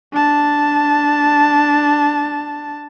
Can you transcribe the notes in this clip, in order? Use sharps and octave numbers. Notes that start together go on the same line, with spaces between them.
D4 A5